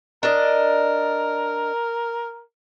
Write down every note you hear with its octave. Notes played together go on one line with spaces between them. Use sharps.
D4 A#4 D#5